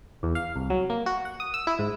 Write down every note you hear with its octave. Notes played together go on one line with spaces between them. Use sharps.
E2
F5
C2
F#3
A#3
F#4
F#5
D#6
E6
E4
G#2